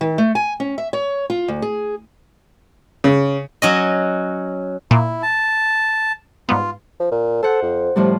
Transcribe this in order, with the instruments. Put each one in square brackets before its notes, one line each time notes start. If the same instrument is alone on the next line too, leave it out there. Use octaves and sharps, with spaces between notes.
[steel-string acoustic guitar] D#3
A3
G#5
C#4
E5
C#5
F4
D2
G#4
[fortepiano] C#3
[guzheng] F#3 C#4 D#5
[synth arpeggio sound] A#2 [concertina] E4
[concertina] A5
[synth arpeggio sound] G#2 G3 B3 [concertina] F4
[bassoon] F3
A#2
[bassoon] A4 [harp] C5 F#5
[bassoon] F2
[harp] A2 F3 G3 [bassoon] C3